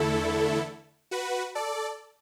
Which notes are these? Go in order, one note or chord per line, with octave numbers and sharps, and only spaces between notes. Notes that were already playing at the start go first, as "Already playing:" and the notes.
Already playing: E2 D3 A3 E4 A4
F#4 B4
A4 D5